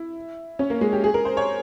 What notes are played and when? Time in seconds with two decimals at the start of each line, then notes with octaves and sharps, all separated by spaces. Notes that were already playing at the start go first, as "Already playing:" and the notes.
Already playing: E4
0.59 C#4
0.70 A#3
0.81 G#3
0.93 G4
1.04 G#4
1.14 A#4
1.25 C5
1.37 C#5